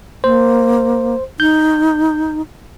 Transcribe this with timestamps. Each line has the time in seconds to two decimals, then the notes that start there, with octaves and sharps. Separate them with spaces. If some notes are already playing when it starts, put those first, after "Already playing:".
0.24 A#3 C5
1.40 D#4 G6